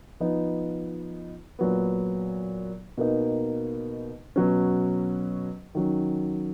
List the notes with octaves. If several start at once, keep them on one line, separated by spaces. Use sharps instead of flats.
F3 B3 D#4
A#2 F#3 B3
B2 A#3 D#4
B2 F#3 C#4
D#3 F#3 C#4